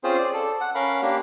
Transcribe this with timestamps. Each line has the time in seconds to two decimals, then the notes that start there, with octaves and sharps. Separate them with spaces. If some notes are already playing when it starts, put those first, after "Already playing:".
0.04 C4 C#4 F4 G#4 C5
0.17 D5
0.34 A4
0.61 F#5
0.75 C#4 A#4 F5 B5
1.02 A#3 D4 G4